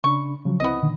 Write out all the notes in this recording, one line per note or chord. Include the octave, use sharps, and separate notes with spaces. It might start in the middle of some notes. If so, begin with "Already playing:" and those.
C#3 D4 B5 C#6
C#3 F3 F#3
C2 B3 C4 E4 D#5
A#2 D3 D#3